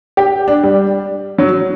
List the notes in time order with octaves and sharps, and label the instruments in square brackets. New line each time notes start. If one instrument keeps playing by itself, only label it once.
[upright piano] G4
D4
G3
F#3